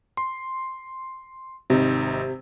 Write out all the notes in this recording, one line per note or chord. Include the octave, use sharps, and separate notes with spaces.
C6
G#1 C3 D#4